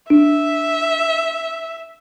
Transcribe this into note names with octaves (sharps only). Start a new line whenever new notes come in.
D4 E5